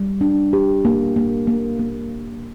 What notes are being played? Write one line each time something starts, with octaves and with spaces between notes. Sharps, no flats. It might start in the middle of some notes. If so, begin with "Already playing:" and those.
Already playing: G3
D4
G4
A#3
A#3
A#3
A#3